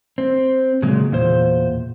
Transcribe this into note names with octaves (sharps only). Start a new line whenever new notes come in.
C4
A#2 C#3 F#3 G#3
E2 A#2 C5